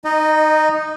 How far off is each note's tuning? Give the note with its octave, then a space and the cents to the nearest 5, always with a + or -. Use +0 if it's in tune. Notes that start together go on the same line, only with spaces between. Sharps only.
D#4 +0 D#5 -20